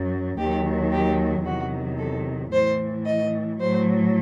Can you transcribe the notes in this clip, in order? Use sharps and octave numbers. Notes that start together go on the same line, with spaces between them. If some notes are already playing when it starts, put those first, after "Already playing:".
Already playing: F#2 F#3
D#2 D#3 F#3 G4
G4
E2 C3 D#3 F#3 F#4
A4
A2 E3 C5
D#5
A2 F#3 C5